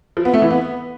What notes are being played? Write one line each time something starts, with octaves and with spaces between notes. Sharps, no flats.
F3
B3
A3
E3
B3